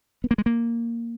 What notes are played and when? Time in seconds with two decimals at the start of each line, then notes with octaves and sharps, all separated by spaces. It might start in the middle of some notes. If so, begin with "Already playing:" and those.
0.24 B3
0.31 A#3
0.38 G#3
0.46 A#3